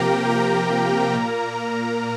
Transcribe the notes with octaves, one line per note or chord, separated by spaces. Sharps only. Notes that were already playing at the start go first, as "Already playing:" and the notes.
Already playing: C3 F3 A#3 G4 A#4 G5 A#5
A#4 A#5
A#2 A#3